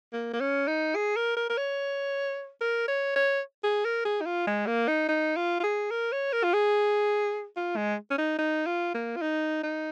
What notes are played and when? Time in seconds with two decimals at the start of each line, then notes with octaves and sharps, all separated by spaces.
0.13 A#3
0.33 A#3
0.40 C#4
0.68 D#4
0.95 G#4
1.16 A#4
1.37 A#4
1.50 A#4
1.57 C#5
2.61 A#4
2.88 C#5
3.16 C#5
3.64 G#4
3.85 A#4
4.05 G#4
4.21 D#4
4.26 F4
4.47 G#3
4.67 A#3
4.88 D#4
5.08 D#4
5.36 F4
5.60 F4
5.63 G#4
5.91 A#4
6.12 C#5
6.32 A#4
6.43 F4
6.53 G#4
7.56 F4
7.77 G#3
8.10 C#4
8.18 D#4
8.38 D#4
8.66 F4
8.94 A#3
9.16 F4
9.21 D#4
9.63 D#4